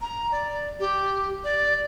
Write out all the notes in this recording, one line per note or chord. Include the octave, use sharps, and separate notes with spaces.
A#5
D5
G4
D5